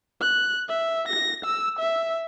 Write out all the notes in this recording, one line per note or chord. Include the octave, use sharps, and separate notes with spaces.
F#6
E5
A#6
E6
E5